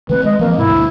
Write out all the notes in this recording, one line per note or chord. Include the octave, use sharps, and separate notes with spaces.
D#3 A3 C4 B4
G#3 D#5
E3 F3 A#3 C4
G#2 B2 G3 E4
D2